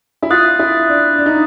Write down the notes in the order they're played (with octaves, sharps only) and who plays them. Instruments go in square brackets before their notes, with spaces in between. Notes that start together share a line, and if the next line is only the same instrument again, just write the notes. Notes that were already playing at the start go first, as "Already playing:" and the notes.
[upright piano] E4
[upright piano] F4 [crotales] D#6 F#6 A6
[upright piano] E4
D4
D4
D#4